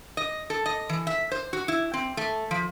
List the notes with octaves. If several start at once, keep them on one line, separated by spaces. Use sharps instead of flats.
D#5
A4
D#5
E3
E5
C5
F#4
E4
C4
A3
F3